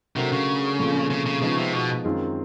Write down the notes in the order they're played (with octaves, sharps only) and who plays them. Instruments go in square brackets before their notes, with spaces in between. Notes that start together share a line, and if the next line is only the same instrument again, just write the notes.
[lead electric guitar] C3 [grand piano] F#3 A3 D4 F#4 A#4
[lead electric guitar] C#3
[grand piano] A#2 F3 A3 C4
[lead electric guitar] C#3
C#3
[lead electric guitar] C#3 [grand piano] F3 G#3 B3 D#4 G#4
[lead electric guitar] C3
B2
[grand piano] F#2 D#3 G#3 C4 F4